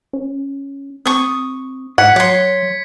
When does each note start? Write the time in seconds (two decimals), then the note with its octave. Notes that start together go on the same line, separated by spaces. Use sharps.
0.13 C#4
1.06 C4 C#6 D#6
1.98 G#2 F#5 G#6 B6 C#7
2.16 F#3 C#5 C6